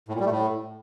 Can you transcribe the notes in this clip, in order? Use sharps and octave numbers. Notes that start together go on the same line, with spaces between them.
A2
A#2
G3
A3
A2